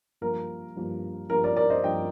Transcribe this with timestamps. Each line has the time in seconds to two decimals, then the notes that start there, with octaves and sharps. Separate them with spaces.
0.21 G2 F3 A#3 A#4
0.76 G2 F3 A#3
1.30 G2 F3 A#3 A#4
1.44 A#4 D5
1.56 A#4 D5
1.70 C5 D#5
1.84 G2 F3 A#3 D#5 G5